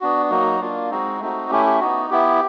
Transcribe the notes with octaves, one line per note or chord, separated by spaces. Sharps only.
B3 D4 F#4
F#3 A#3 D#4 F#4
A#3 D4 F4
G#3 C4 D#4 F#4
A3 C4 D#4 F#4
A3 C#4 E4 G4
G4
B3 D#4 F#4
B3 E4 G4